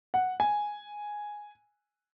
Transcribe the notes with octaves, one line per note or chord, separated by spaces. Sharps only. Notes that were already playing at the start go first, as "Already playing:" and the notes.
F#5
G#5